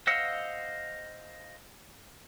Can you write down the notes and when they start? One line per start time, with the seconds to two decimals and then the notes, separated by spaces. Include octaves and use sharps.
0.07 C5 D#5 F5 F#5 E6